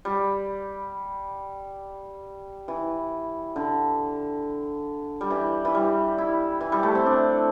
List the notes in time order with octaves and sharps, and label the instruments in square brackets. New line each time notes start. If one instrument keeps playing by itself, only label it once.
[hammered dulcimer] G3
E3
D3
G3
E3
E3
G3
E4
E3
G3
A3
C4
D4